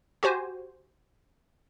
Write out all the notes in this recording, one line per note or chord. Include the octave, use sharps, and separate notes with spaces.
F#4 G4 C5 G#5